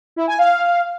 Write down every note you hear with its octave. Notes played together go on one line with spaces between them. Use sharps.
E4
G#5
F5